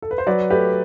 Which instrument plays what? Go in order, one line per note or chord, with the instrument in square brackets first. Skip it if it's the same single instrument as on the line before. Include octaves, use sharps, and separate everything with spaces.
[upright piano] A4
B4
C5
F#3 B4 D5
A3 G4 B4